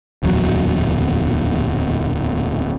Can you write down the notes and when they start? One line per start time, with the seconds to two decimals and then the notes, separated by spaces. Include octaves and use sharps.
0.23 D1 A#1 E2 F#3